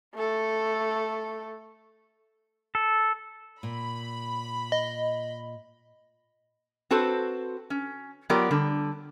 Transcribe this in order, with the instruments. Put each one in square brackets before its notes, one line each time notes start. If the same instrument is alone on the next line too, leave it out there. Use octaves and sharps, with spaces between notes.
[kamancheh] A3 A4
[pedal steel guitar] A4
[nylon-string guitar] A#2 [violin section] B5
[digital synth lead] D#5
[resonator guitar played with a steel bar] C4 F#4 A4 B4 C5
C#4
F#3 B3 F4 G4 A#4 D5
D3 G3